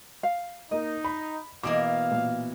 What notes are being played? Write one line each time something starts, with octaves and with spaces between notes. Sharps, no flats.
F5
A#3 D#4 D#5
B5
B2 E3 A#3 F5 D6
A#2